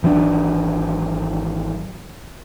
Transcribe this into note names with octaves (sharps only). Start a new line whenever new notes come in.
G#1 E3 F#3 D4